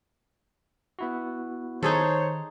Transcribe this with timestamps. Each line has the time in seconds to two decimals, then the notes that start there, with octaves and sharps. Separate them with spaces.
0.99 B3 E4 F#4
1.83 D#3 D#4 G#4 A4 C5 C#5